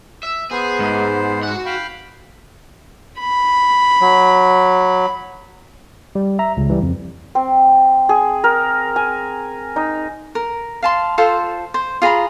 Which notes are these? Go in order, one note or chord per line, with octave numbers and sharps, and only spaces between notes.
E5
B3 G#4 C5
G#2
F#4 F#5
F5 G5 B5
B5
F#3
G3
E5 A#5
C#2 C#3
E3 G3
F2
C4
G#4
A#4
G#5
D#4
A#4
F5 A5 C6
F4 A4 C5
C5
F4 G#4 A#5 B5